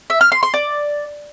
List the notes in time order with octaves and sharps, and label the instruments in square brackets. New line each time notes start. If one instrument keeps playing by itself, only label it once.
[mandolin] E5
F6
C6
C6
D5